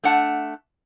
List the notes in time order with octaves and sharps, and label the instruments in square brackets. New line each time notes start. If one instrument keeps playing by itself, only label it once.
[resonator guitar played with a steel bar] A3 D4 F#5 A5